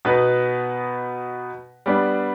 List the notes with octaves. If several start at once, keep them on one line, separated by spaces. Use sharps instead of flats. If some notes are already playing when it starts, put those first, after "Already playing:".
B2 B3 D#4 B4
G3 B3 D4